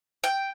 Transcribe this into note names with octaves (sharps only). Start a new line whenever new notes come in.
G5